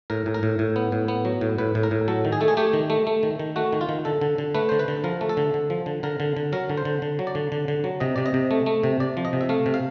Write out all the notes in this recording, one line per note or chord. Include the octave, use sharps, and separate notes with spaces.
A2 A#4
A2
A#4
A2
A2
B3
A2
B3
F#3
A2
A2 B4
A2
A#4
A2
F#3 A4
D#3
G#4
A3 A4
G#4
A3 G4
D#3
A3
A3
D#3
D#3
A3 F#4
D#3
F4
D#3
D3 A4
D3
D3
A3 B4
D3 C5
B4
D3
F3 A#4
A3
A4
D3
D3
F3
D3
D3 A#4
D3
D3
F#3 A#4
D3
C5
D3
D3
F#3
D5
D3
D3
D3
F#3
C3 D#5
C3 D5
D#5
C3
A3
A3
C3
C3 D5
F3
D#5
C3
E5
A3 F5
C3
F5